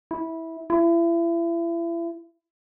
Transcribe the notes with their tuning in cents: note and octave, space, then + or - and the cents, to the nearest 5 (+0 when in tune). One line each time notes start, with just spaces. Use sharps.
E4 -15
E4 +35